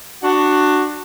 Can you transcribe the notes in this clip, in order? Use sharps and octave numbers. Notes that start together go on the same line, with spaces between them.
D4 F#4